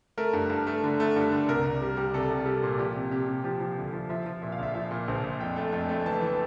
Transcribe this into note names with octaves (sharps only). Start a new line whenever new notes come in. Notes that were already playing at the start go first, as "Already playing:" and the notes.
A3 A#4
G2
G2
A3
D3
A3
G2
D3
C2 A#4
C2
G3
G3
C2 A4
C2
G3 A4
A#2
F3 G4
C3
C3 G4
C3
F3 G4
F3
D2
F3
F3 E5
F3
A#2 E5
F5
A#1 E5
F3 E5
A#2
A#1 C5
A#1
F2 G5
A3
F2
A3
E3 A5
E3